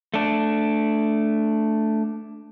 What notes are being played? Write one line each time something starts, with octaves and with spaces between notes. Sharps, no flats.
A3 D4